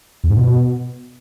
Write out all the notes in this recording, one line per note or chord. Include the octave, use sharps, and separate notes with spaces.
E2
G#2
B2